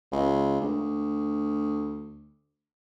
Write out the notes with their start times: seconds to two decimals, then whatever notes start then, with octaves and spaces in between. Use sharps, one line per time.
0.12 C#2
0.60 D2